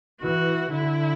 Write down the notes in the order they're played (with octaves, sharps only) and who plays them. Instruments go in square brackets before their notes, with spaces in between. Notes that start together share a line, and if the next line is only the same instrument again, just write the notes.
[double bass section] E3 [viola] F#4
[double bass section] D3 [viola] E4